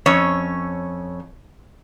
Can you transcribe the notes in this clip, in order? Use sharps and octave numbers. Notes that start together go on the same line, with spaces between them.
F2 C#4 C#5